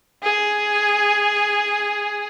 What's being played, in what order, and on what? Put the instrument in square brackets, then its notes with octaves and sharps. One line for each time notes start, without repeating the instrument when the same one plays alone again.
[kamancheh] G#4